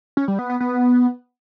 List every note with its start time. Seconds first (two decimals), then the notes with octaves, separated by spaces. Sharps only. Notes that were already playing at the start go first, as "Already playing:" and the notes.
0.17 C#4
0.28 G3
0.39 B3
0.50 B3
0.60 B3